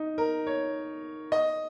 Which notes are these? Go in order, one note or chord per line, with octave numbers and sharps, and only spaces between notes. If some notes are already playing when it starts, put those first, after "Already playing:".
Already playing: D#4
A#4
C#5
D#5